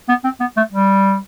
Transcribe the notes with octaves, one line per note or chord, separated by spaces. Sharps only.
B3
C4
B3
A3
G3